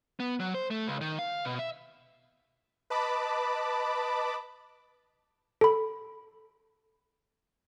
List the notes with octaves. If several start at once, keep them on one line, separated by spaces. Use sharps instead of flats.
B3
F#3
C5
A3
C#2
D#3
F5
B2
E5
B4 D#5 A5 B5 D6
A4 B5